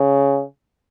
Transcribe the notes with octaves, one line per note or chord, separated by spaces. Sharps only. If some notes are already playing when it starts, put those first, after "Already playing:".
Already playing: C#3